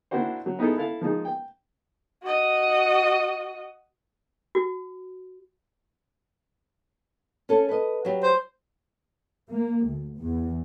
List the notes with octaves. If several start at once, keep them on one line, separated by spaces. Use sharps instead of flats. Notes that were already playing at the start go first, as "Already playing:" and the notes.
A#3 C4 D4 E4 F#4 C5
F#3
B3 D#4 E4 G#4 A4
E4 A4 F5
F3 G#3 D#4 G#4
G5
F#4 D#5
F#4
C#4 A4
B4 D#5
F#3 G3
C5
A#3
D2
E2